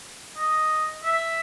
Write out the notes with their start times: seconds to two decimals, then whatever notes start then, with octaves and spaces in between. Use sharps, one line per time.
0.37 D#5
1.04 E5